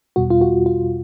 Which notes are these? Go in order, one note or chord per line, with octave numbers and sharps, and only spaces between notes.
E2 B2 G3 F#4
F4
F#4
F4